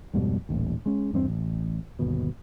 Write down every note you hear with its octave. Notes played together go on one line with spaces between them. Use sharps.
F2 G#2 B2 G3
D#1 A1 D#2
G#3 C#4
E2 G2 B3 C4
A1
G1 D#2 B2